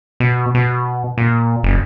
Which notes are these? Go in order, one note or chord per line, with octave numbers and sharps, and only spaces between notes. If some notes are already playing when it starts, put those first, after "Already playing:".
B2
B2
A#2
F#1